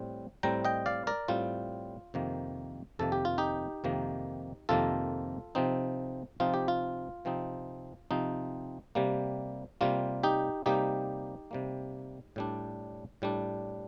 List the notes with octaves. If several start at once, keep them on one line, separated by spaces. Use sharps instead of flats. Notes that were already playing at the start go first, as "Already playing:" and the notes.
Already playing: A2 G3 C4
A2 G3 C4 G5 A#5
D#5 G5
D5 F5
A#4 D5
A2 G3 C4 F4
F2 C3 D#3 A#3
F2 C3 D#3 A#3 A4
G4
F4
D#4 G4
F2 C3 D#3 A#3
F2 C3 D#3 A#3 F4 A4
C3 F3 C4 D#4
C3 F3 C4 D#4 F4
G4
F4
C3 F3 C4 D#4
C3 F3 C4 D#4
C3 G3 A#3
C3 G3 A#3 F4
D#4 G4
C3 G3 A#3 D#4 G4
C3 G3 A#3
A2 G3 D4
A2 G3 D4